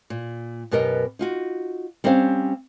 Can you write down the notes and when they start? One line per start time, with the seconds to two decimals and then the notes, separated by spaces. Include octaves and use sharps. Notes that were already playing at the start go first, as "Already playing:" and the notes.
0.10 A#2
0.71 F#2 B2 B3 G4 A#4 D#5
1.19 D#4 F4 F#4
2.04 G3 C4 C#4 C5 D5 F5